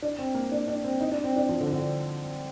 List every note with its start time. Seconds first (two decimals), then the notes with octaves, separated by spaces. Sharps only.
0.02 D4
0.18 C4
0.35 A#3
0.52 D4
0.68 D4
0.84 C4
1.00 D#4
1.12 D4
1.24 C4
1.36 D4
1.49 F3
1.61 D3
1.73 D3